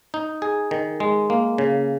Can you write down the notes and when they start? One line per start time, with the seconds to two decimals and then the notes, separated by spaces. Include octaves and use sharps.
0.14 D#4
0.42 G#4
0.71 D#3
1.00 G#3
1.30 A#3
1.58 C#3